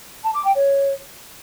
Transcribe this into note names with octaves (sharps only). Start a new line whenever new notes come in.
A5
D6
G5
C#5